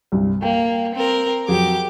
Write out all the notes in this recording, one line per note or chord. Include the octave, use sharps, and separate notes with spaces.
C2 G2
A#3 G5
C4 A#4
F2 F#3 G4 G#4 D6